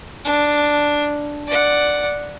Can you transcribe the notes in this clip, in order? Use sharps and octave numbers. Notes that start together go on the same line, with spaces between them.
D4
D5 F#5